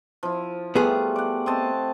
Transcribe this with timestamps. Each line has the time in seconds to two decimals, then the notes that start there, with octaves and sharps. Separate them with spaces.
0.23 F3 E4
0.75 G3 A3 B3 F4 G#4
1.16 D5 F#5
1.46 C4 D#5 A5